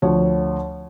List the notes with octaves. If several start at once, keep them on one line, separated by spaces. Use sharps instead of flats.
D2 F3 C#5